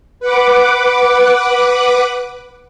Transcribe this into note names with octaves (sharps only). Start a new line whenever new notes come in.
B4 F#5 D6